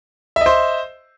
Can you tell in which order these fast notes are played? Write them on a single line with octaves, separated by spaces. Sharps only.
E5 D#5 C5